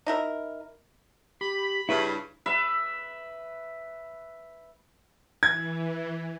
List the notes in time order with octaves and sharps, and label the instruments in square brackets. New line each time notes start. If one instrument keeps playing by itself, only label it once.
[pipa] D#4 E4 A#4
[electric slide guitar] G4 [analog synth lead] B5
[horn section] G2 C#3 [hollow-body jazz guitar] E4 B4 [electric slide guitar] E5
[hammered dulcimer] B4 E5
[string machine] E3 [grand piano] G#6